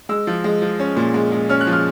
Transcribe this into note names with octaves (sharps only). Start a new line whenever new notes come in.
G#3 E6
F3
G#3
F3
C#4
A#2
G#3
G#3
C#4 F6
F#6
F3
F6